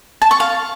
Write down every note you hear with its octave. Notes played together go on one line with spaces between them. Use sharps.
A5
C#6
F5